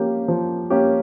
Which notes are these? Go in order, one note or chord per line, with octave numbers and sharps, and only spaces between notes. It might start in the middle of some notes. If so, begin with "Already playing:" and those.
Already playing: F3 A#3 C#4 G4
F3
A#3 C#4 G4